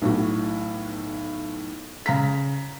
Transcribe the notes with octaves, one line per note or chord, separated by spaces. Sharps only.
B1 A2 F#4
C#3 A#5 B6